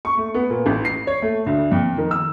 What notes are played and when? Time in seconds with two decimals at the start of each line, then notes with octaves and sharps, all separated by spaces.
0.05 C#6
0.17 A3
0.34 B3
0.50 A#2
0.66 A1
0.85 C7
1.07 C#5
1.22 A3
1.46 D2
1.71 F2
1.98 D#3
2.11 E6